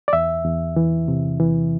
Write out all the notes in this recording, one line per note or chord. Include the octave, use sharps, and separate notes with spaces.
D5
E2 E5
E2
E3
C3
E3